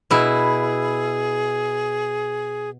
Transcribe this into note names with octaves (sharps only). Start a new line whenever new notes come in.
B2 E4 G#4